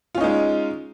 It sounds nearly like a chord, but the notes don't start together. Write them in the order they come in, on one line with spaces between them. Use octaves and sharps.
F4 C#4 D#4 G#3